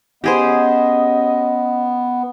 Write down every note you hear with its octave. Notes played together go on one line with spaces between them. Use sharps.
B3 C#4 G4 G#4 C5 D#5